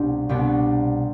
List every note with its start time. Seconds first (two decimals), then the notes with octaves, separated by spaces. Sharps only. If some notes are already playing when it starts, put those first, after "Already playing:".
Already playing: C2 B2 B3 D4
0.29 C2 B2 B3 D4